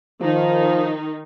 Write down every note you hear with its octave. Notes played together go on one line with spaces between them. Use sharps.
D#3 F3 D#4